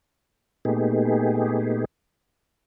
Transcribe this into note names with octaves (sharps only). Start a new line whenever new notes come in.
A#2 A3 B3 D#4 G4 G#4